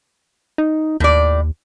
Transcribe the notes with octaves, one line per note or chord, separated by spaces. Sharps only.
D#4
D#2 A2 D5